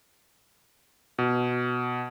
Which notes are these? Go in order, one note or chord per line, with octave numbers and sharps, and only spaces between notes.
B2